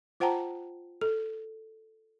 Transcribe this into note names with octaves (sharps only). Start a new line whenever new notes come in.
F4 C5 F#5 G5 A5 A#5
A4